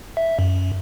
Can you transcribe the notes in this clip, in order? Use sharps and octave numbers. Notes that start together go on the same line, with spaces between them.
E5
F#2